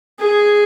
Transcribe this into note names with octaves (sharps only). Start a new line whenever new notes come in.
G#4